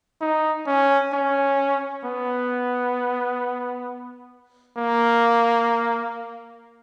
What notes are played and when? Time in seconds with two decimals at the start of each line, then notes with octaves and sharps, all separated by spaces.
0.21 D#4
0.67 C#4
1.13 C#4
2.04 B3
4.77 A#3